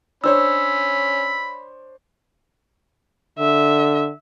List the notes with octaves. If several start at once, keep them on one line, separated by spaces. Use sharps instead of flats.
C#4 D4 C5 C#5 B5 E6
D3 E5